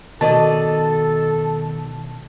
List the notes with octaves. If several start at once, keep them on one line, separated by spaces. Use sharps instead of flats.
B2 D#3 A4 D5 D#5 A5